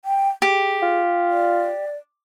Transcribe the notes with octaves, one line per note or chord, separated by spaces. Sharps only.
G5
G4 G#4
F4
D5